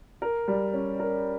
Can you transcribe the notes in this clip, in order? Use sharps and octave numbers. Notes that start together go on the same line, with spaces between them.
A#4
G3
C#4
A#4